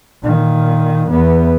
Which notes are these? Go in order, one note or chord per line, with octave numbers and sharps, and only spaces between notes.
A#2 D#3
E2 B3